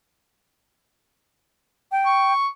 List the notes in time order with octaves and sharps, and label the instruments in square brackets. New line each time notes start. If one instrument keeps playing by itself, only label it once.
[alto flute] G5
[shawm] C#6